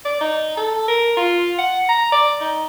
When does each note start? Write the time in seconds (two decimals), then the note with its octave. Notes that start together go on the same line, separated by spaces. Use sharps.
0.05 D5
0.21 D#4
0.57 A4
0.88 A#4
1.17 F4
1.59 F#5
1.89 A#5
2.12 D5
2.41 D#4